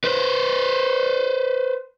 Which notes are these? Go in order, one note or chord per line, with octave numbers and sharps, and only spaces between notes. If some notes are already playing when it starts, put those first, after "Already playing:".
B4 C5